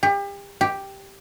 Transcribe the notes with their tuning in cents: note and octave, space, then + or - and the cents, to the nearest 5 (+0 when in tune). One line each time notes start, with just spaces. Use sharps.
G4 +35
G4 +0